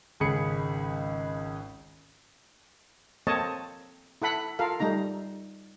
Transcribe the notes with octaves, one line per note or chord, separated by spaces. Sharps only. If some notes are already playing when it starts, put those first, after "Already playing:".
G#1 C#2 C#3 G#4 B5 C#7
A#3 C4 A4 C#5 D#5 A5
E4 A4 F#5 B5
F4 A4 A#4 F5
G3 A3 D#4 A#5